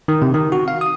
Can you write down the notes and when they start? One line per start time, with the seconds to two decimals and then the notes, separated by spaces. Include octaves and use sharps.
0.08 D#3
0.22 C3
0.34 D#3
0.52 F#4
0.68 F5
0.81 D#6